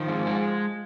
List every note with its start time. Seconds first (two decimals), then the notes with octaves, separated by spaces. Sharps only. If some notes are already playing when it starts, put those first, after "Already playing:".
Already playing: D#3 F3
0.08 G#2
0.26 G#3